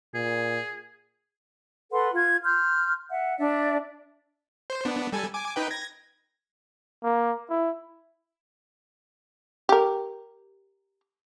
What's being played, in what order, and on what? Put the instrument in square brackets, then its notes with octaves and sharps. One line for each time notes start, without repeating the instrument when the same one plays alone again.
[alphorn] A#2 [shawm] G#4
[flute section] A4 B4 F#5 C6
F4 G#6
C6 F6 G6
E5 F#5
D4 D5 E5
[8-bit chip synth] C5
B3 D4
G3 A4 G#5
G#5 D6
D#4 B4 G5
G#6 A#6
[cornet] A#3
E4
[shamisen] G4 A#4